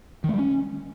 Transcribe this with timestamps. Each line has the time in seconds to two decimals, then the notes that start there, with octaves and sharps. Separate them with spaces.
0.24 D#3
0.29 A3
0.34 G3
0.39 C#4